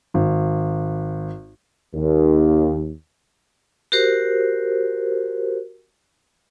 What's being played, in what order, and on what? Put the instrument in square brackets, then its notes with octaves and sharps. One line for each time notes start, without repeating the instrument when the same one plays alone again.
[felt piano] G#1
[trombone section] D#2
[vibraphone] F#4 G4 A#4 C5